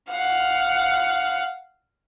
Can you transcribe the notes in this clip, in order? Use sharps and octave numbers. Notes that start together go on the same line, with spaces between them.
F5 F#5